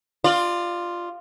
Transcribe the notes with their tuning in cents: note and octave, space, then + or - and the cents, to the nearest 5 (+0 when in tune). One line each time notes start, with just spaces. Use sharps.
F4 +0 D5 +30